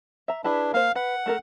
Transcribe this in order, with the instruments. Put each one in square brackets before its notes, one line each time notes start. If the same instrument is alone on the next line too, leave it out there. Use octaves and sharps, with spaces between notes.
[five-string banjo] E5 A#5
[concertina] D4 [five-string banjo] E4 G#4 B4
[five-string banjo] A#3 C5 [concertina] F5
[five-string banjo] B4 [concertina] F#5
[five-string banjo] A3 A4 A#4